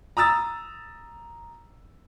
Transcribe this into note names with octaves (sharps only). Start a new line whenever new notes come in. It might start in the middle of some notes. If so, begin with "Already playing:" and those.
A#5 D#6 E6 A6